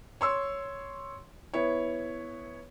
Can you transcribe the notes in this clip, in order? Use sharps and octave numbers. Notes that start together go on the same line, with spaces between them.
C#5 C6 E6
B3 E4 C#5